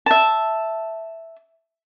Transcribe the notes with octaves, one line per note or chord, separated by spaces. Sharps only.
E5 A5